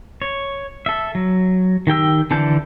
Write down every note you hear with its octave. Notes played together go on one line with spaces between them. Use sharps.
C#5
A4 E5
F#3
D#3 G4 G5 E6
D3 E3 A5 G6